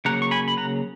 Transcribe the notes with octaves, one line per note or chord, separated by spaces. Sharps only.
C#3 F#3 A#3 F#5 A#5
C#6
G#5 B5
B5
F#5 A#5